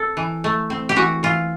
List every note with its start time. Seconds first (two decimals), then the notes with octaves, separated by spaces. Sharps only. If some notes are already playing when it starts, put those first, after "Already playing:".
Already playing: C4 A4
0.17 E3
0.44 A3
0.70 C4
0.89 G4
0.96 E3 F#4
1.23 E3 F4